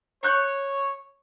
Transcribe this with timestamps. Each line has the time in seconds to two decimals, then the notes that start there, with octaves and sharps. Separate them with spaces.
0.23 C#5 C#6 F#6 G6